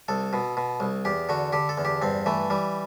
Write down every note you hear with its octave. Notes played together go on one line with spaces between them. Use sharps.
C2 A4
B2
B2
C2
E2 G4
D3 F#4
D3 G4
A4
E2
G4
G2 C4
E3 A3
E3 G3